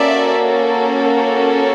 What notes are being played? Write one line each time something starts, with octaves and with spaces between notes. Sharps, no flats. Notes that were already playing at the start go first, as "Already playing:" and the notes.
Already playing: A#3 C#4 F#4 A4 D5 E5